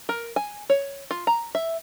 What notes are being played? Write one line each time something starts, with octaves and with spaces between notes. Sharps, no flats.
A#4
G#5
C#5
F4
A#5
E5